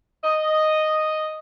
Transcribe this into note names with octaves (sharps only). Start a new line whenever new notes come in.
D#5